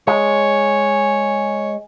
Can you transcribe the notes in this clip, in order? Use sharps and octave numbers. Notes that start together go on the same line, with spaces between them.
G#3 C#5